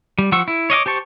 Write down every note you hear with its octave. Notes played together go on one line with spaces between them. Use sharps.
G3
F3 F#5 C#6 E6
E4
C#5 D#5 F5 D6
G4 C5 A5 C#6